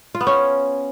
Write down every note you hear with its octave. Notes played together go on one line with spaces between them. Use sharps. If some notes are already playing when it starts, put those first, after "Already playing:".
F4
B3
C#4